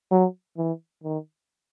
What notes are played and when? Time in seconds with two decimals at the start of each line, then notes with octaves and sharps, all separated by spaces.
0.11 F#3
0.58 E3
1.03 D#3